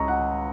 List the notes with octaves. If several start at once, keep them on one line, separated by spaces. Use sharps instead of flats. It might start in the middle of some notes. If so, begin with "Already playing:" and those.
Already playing: C#2 C#4 D#5 A#5 C#6
F#5